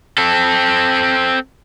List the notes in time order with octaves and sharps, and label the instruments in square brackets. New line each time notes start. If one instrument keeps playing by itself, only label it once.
[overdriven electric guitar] C4 A4